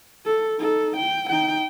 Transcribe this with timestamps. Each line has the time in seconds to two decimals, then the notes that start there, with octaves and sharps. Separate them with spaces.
0.26 A4
0.59 D#4 A4
0.97 G5
1.30 D#4 G5